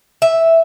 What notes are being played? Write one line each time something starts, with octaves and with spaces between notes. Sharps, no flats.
E5